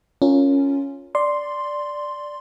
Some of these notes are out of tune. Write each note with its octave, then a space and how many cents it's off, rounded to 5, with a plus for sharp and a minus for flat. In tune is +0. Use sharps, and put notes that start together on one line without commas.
C#4 +0 F4 +0 A#4 -20
D5 +0 C6 +0